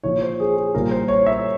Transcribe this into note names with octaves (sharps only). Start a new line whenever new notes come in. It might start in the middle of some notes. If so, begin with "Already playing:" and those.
A#2 F3 C#5
C5
G#4
G#4
A#2 G3 A#4
C5
C#5
E5